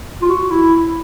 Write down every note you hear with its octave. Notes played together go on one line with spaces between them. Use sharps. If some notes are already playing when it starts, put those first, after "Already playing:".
F4
F#4
E4